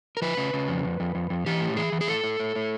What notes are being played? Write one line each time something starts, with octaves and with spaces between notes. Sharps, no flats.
A#4
F3 B4
C#3
C#3
F2
F2
F2
F2
F2
E3 G4
A2
E3 G#4
E3
G#4
A2 A4
A2
A2
A2